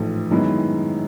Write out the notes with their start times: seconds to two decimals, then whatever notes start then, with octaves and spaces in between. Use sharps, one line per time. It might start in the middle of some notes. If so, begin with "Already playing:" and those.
Already playing: A1 G#2 F3 A3
0.31 F#2 D#3 G#3 B3 E4